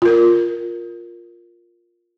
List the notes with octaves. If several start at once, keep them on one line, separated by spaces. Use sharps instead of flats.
F4 A#4